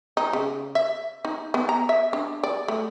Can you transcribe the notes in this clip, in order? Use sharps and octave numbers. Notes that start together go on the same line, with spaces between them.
D#4
C#3
E5
D#4
B3
A#5
E5
D4
D5
A3